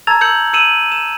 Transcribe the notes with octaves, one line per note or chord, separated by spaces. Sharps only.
A5 A#5 E6 G#6 A6 F7
E6 G6 C#7 F#7
E6 C#7 D#7 E7 F#7
E7